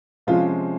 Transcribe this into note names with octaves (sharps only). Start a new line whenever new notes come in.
C3 F3 G#3 C#4 F4